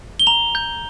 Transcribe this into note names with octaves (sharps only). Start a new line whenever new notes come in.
G7
A#5 F7
G6